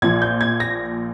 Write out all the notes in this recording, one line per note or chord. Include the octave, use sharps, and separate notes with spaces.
A#1 A#2 F3 G#6
G6
G#6
A#6